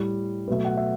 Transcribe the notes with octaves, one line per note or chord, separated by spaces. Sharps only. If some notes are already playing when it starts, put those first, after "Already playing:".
Already playing: A2 G3
B2 F#3 A3 B4
F#5
E5